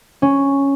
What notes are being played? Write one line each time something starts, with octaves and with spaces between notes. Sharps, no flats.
C#4